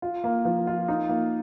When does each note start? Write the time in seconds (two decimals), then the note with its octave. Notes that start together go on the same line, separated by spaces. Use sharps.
0.02 F4
0.24 A#3
0.45 F3
0.67 F4
0.88 D#4
1.09 A#3